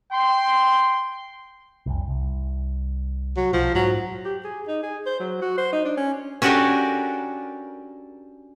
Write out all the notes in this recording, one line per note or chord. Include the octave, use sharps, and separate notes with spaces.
G5 C6
F1 C2
C2
F#3
B1 F3
G#2 F#3
G4
G#4
D#4
G#4
C5
F#3
F#4
C5
D#4
D4
C#4
C#4 D4 F#4 G4 A4 A#4